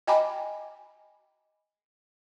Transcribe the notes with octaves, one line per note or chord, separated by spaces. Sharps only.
D#5 G5 G#5 A#5 B5 D6